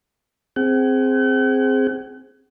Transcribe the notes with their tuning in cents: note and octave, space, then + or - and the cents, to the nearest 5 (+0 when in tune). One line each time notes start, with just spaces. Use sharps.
C4 +0 G#4 +0 F#5 +45